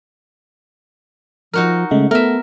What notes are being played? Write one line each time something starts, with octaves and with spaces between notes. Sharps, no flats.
F3 D#4 F#4 A#4
C#3 G#3 A3 D#5
A3 B3 A#4 E5